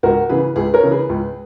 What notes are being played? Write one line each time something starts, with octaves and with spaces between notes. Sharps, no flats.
C#2 F#4 A#4
C#3 E3 G#4 B4
C#2 G#4 B4
A#4 C#5
C#3 E3
G#4 B4
C#2